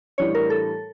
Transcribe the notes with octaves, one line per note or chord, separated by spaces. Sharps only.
A2 E3 G3 D4 C#5
A#4
A4